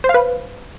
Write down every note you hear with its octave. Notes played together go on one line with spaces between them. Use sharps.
C5
F5
B4